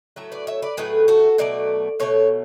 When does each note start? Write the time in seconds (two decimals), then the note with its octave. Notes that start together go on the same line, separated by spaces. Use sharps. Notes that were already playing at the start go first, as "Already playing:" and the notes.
0.16 A2 F#3 A3 E5
0.32 B4 D5
0.47 C#5 E5
0.62 B4 D5
0.77 A2 F#3 A3 G#4 B4
1.08 F#4 A4
1.38 B2 F#3 A3 D5
2.00 B2 F#3 A3 A4 C#5